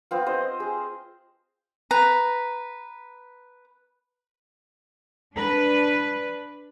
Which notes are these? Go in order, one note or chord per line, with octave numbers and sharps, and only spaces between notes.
B3 C4 F4
C5 D#5
G#4
B4 A#5
D4 B4